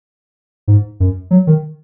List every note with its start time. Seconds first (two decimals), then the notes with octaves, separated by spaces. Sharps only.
0.68 G#2
1.00 F#2
1.31 F#3
1.47 D#3